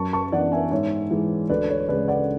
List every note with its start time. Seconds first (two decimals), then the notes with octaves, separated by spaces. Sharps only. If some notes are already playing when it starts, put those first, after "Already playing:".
Already playing: F#2 A5 C#6
0.13 A5 C#6
0.32 E3 B3 D4 D5 F#5
0.52 E5 G#5
0.71 G#2 C#5 E5
1.11 E3 G#3
1.50 D2 B4 D5
1.69 C#5
1.89 C#3 G#3 B4 D5
2.08 D5 F#5